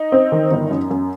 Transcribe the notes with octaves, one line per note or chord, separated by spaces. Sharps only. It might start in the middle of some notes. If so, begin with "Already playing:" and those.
Already playing: D#4 D#5
C4
D#3
G1
F#2
F#2